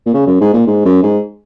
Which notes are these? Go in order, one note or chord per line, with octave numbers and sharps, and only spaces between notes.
A#2
C#3
F#2
G#2
A#2
G#2
F#2
G#2